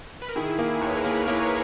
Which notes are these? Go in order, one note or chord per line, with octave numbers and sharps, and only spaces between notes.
B4
A#4
D#3 E4 G#4
A#3
D#2 C#5
B4
A#4
A#3 G#4 B4
A#3 A#4 C#5